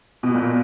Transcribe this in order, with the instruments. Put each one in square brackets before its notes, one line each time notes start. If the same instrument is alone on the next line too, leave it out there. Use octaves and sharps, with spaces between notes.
[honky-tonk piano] B2
A#2